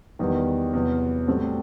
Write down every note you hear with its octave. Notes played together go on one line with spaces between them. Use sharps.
E2 D#3 G3
E2 C3 F#3
A2 G3 C4 F#4 A4